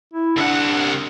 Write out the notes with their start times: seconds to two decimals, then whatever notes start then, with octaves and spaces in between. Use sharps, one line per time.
0.13 E4
0.38 C2 D4 F#5